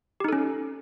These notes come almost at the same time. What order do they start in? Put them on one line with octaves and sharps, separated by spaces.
G4 D#4 A4 C#4